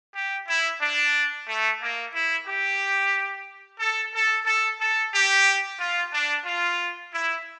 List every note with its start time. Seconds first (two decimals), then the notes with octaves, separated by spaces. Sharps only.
0.15 G4
0.48 E4
0.81 D4
1.47 A3
1.81 A#3
2.14 E4
2.48 G4
3.80 A4
4.14 A4
4.46 A4
4.81 A4
5.14 G4
5.80 F4
6.13 D4
6.46 F4
7.13 E4